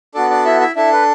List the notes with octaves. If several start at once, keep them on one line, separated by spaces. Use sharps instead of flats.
B3 D4 F#4 A4 D5
D4 D5
E4 E5
E4 E5
D4 E4 A4 E5
B4